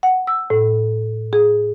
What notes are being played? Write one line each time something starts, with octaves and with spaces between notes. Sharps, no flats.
F#5
E6
A2
G#4